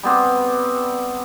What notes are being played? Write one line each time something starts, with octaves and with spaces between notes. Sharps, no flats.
G3 B3 C4